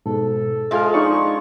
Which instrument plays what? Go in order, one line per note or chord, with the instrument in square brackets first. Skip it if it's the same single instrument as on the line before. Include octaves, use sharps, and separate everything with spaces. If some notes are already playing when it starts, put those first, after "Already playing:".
[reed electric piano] G#2 B2 [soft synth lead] A4
[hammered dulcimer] F3 G#3 [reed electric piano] E5 G#5 F6
[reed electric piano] D4 D#4 D5 [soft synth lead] C#6